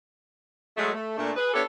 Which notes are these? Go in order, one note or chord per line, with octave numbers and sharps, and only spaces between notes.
F#3 G#3 A3
A3
A#2 A3 D4
G#4 B4
B3 D4 E4 G4 A4 C#5